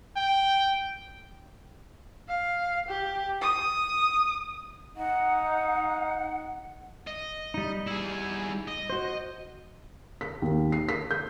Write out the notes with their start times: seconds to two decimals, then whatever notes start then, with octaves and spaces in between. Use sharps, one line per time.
0.17 G5
2.28 F5
2.88 G4
3.41 D#6
4.97 D#4 F#5
7.07 D#5
7.54 G3 D#4
7.87 E4 G#4
8.68 D#5
8.90 F#4 C5
10.21 B6
10.42 D#2
10.72 C7
10.89 B6
11.11 G6